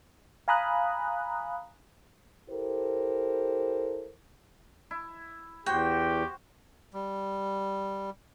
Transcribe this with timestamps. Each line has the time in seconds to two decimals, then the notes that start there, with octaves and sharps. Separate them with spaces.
0.48 F5 G#5 A#5 B5 D#6 F#6
2.50 E4 G4 A4 A#4 C5
4.91 E4
5.66 E2 F#4 G4 C5 G5
6.94 G3